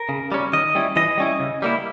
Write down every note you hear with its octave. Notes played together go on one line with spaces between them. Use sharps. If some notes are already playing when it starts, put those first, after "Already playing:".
Already playing: A#4
C#3
G3 C#4
D#3 D#5
G3 C#4 E4
E3 D#5
G3 C#4 E4
C#3
G3 A#3 E4